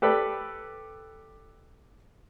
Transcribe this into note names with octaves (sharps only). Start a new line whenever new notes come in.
G4 A4 B4 D5